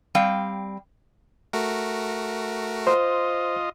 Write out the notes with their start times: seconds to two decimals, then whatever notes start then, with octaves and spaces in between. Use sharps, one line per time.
0.15 G3 C4 F5 G5
1.53 A3 F#4 A#4
2.87 F4 C5 D#5